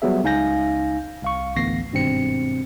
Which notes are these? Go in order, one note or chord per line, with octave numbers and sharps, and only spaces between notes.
F#3 G3 B3 G#4 E5
C#2 D#4 F5 G#5 G6 A#6
C2 F5 C#6
A1 D2 B3 A#6 C7
G#1 G2 B2 C4 C#7